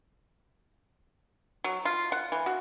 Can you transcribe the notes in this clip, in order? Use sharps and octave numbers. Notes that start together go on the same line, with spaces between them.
F#3
F4
F#5
E3
F#4